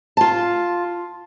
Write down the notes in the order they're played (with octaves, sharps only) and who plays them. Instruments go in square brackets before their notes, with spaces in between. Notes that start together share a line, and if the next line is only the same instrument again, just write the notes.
[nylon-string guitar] F4 A5